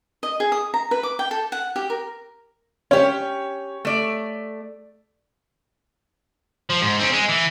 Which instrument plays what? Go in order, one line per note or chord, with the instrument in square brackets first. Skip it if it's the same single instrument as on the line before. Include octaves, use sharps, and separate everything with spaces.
[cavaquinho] D#5
G#4
D#6
A#5
B4
D6
G5
A4
F#5
G4
A#4
[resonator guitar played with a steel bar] C#4 G4 [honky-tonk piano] C#5
[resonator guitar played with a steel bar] A3 D5
[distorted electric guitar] F3
G#2
C4 C#4
G#3
E3